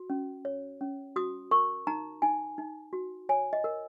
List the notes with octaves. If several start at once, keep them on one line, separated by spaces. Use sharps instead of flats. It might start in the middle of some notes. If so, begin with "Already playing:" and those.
Already playing: F#4
C#4
C#5
C#4
F#4 D#6
A#4 C#6
D#4 A#5
D#4 G#5
D#4
F#4
C#5 G#5
D#5
A#4